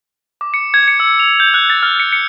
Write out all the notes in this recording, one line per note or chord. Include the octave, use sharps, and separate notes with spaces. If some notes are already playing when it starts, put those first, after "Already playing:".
D6
C#7
G#6
C#7
E6
F7
G6
F#6
A6
F6
C#7
C#7